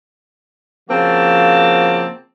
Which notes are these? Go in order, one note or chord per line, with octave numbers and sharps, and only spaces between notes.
C#3 F3 A#3 C4 F#4 A5